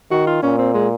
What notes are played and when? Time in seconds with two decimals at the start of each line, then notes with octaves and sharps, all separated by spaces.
0.11 D#3 F#4
0.27 F4
0.43 A#2 C#4
0.59 C4
0.74 G#3